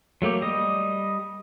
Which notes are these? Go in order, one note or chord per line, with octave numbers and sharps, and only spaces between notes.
F#3 A3 A#3 G4
G3 D#5